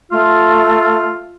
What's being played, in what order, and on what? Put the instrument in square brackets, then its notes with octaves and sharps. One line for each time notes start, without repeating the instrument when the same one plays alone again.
[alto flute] A3 [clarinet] F4 [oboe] F5